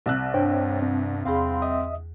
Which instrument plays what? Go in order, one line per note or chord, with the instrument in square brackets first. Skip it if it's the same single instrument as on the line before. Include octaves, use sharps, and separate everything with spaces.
[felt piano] C2 E6 F#6
[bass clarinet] G2 [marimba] D4 [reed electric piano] C5 C#5 G5
[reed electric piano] C4
[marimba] E2 G#4 [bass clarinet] C4 [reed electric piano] F5 B5 C6
[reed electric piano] D#5 E5 D#6